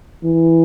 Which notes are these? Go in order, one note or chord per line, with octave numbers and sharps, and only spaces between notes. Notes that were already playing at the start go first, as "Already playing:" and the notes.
E3